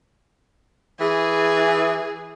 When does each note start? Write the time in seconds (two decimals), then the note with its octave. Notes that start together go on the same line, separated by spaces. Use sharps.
1.00 E3 G#4